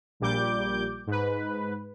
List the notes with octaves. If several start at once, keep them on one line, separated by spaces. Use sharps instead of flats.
A#1 A#2 G3 D6 G6
G#2 B4